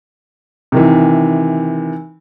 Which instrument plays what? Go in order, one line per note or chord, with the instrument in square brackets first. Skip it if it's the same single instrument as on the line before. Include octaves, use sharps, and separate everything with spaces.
[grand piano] C3 D#3 E3